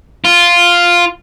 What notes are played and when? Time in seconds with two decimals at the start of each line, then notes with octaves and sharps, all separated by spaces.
0.25 F4